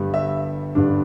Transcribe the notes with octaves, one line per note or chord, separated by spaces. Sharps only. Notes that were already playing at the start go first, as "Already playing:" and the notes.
Already playing: G1 G2 G3
E5
G1 G2 D3 G3 D4